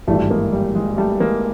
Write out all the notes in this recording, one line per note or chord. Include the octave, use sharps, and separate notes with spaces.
G#1 G2 E3 G3 A3
G#3 A#3
G3
G#3
G3 A3
G#3 A#3